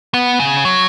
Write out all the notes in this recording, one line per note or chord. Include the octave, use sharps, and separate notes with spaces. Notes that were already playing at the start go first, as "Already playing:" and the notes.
B3
C#3
F#3